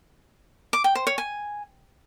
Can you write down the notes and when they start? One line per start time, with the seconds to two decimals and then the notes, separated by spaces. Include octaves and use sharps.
0.73 D6
0.84 G5
0.95 C5
1.07 C#5
1.18 G#5